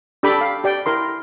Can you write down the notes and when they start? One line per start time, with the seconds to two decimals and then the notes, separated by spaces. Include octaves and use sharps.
0.23 D4 G4 A4 G5 B5 D6
0.41 F5
0.64 G4 D5 G5
0.86 E4 A#4 C6